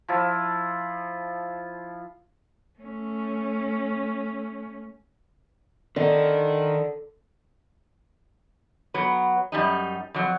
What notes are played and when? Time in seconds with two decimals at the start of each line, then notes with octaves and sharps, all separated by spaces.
0.08 F3 E4 F4 A5
2.79 A3 C#4
5.96 D3 D#3 D#4
8.94 F#3 B3
9.52 F#2 G3 D#4
10.14 F2 F#3